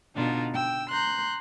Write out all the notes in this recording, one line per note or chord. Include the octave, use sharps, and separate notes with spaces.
B2 D3 D4 D#4 F4
G5 E6
A#5 C6 F#6 G6